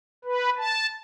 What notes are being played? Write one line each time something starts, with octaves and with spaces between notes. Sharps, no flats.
B4
A5